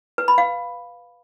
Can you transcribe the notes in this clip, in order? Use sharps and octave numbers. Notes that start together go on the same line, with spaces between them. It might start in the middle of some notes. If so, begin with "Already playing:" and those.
B4
B5
F5